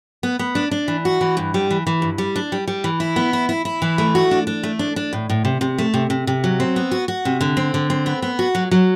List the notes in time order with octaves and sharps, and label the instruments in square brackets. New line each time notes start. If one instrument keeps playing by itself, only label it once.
[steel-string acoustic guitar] B3
B3
D4
D4
E3
F#4
E3
G2
G3
E3
E3
G2
G3
D4
G3
G3
E3
E4
B3
E4
E4
E4
E3
A3
F#4
D4
D4
A3
D4
D4
A2
A2
C3
C3
A3
C3
C3
C3
F#3
C4
B3
F#4
F#4
C3
D3
C4
D3
C4
B3
B3
F#4
F#3
F#3